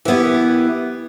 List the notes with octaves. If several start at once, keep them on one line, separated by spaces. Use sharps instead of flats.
E3 B3 E4 G4